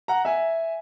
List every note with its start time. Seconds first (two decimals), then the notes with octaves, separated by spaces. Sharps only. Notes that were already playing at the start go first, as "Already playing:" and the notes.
0.08 F#5 A#5
0.25 E5 G#5